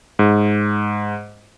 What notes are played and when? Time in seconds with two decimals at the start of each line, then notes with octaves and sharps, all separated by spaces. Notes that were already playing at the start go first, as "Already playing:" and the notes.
0.19 G#2